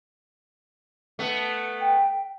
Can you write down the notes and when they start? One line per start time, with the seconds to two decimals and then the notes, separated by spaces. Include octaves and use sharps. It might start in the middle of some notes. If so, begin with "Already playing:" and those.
1.19 A3 B3
1.81 G5